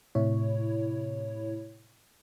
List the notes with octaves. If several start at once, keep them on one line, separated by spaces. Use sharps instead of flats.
A2 C3 E4 C#5